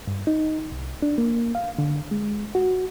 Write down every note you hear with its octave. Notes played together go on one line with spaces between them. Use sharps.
G2
D#4
C2
D4
A#3
F5
D3
G#3
F#4